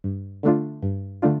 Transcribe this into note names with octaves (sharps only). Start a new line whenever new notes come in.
G2
D3 A3 D4 F4
G2
D3 A3 D4 F4